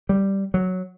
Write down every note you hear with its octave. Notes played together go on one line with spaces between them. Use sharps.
G3
F#3